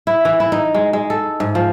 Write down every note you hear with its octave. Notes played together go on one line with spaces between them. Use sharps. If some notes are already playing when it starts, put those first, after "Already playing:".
E4
E3
E4
D#4
G#3
G#3
A4
G#2
F3